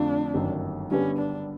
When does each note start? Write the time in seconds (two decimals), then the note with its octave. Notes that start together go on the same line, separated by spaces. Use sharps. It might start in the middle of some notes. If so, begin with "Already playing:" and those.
Already playing: F2 D3 F3 A3 D4
0.34 G1 F#2 D#3
0.90 G2 D3 G3 B3 C#4
1.18 D4